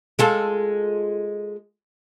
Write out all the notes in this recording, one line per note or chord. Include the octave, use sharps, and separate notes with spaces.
G#3 F4 A4